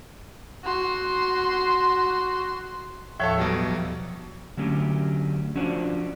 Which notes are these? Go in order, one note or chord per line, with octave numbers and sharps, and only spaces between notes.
F#4 C6
D#2 A2 F3 A4 C#5 E5
B2 F#3 G3
D3 F#3 A3 C#4 G4
F3 C#4 D4 F#4 C5 D5